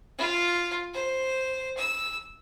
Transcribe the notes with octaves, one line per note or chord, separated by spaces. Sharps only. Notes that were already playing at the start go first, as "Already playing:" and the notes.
F4
C5
E6